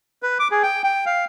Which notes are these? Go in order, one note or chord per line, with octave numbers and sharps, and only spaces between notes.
B4
D6
G#4
G5
G5
F5